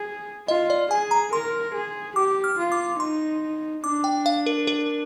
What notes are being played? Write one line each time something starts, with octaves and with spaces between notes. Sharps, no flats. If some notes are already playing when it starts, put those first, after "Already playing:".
Already playing: G#4
F4 D#5
D5
G#4 G#5
A#5
A#4 C6
G#4
G4 D6
F6
F4
D6
D#4 C6
D4 D6
G5
F5
A#4
A#4